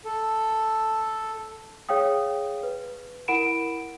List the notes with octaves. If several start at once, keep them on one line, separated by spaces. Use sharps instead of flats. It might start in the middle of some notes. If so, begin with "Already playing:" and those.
A4
G#4 C#5 F5 G5 D#6
B4
E4 A#4 F#5 B5 D7 E7